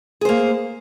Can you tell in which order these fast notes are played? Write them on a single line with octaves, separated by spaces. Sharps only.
G#4 C5 A#3